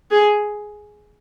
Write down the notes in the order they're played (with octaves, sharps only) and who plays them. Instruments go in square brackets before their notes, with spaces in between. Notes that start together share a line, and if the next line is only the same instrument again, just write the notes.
[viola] G#4